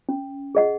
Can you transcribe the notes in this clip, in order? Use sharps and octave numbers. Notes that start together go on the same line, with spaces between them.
C#4
G#4 D#5 F#5